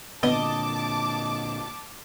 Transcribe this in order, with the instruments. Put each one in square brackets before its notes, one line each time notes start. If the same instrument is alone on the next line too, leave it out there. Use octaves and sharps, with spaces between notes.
[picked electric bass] A#2 D3 [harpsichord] B3 [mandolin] D#5 [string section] A5 D6